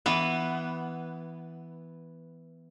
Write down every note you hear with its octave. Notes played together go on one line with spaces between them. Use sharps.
E3 B3